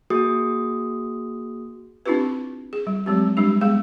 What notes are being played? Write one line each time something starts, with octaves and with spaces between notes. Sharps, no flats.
A#3 F#4 G#4 D#6
C4 D4 E4 F4 G4 B4
G#4
G3
F#3 G#3 C4 G4
G3 G#3 D4 G4
G#3 B3 G#4 F5